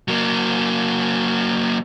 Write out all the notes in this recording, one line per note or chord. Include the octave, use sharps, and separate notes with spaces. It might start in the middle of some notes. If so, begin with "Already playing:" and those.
F#3 A#3